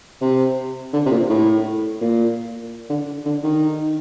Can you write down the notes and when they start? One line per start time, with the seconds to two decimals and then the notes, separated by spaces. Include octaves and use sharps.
0.21 C3
0.93 D3
1.06 C3
1.11 A#2
1.29 A2
2.01 A#2
2.90 D3
3.26 D3
3.43 D#3